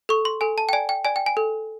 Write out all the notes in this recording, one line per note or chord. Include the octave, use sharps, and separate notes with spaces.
A4 C#6
C6
A4 G#5
A5
G5
D5 G#5
G5
D5 G#5
G5
G#5
A4